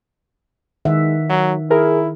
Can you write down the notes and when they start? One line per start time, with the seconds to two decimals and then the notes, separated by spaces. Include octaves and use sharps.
0.85 D#3 G#3 E5 F#5
1.30 F#3
1.70 E4 G#4 A#4